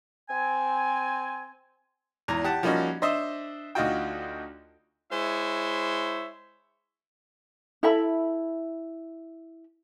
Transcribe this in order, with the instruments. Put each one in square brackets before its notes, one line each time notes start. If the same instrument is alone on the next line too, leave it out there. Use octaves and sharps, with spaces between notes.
[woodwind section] C4 G#5
[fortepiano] G#1 E2 A#5
G4 F#5 A5
F3 G3 A#3 C#4 D#4 F#4
D4 C5 D#5 E5
D2 D#4 F4 F#4 G5
[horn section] G#3 E4 C5 C#5 E5
[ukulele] E4 A4 E5 B5